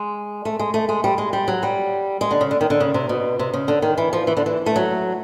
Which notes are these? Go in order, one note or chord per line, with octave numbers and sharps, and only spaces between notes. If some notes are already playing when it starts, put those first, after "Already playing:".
Already playing: G#3
A3
G#3
A3
G#3
G3
G#3
G3
F#3
G3
G#3
D3
C#3
D3
D#3
D3
C#3
C3
B2
C3
C#3
D3
D#3
E3
F3
E3
D3
E3
A3
F#3